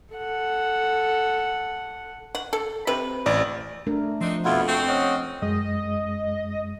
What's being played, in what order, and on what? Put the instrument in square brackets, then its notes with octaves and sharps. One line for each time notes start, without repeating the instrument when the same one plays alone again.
[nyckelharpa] A4 F#5
[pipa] F#5
A4
C3 B4
[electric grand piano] A1 D5
[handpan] A3 D4 A#4
[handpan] F3 [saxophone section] C4 D4 D#4
[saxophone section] F2 [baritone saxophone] B2 [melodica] B3 E4 F4
[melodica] A3 C#6 [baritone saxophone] C4
[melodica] C#4 D#5 F#5
[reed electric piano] F#2 G#3 [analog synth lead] D#5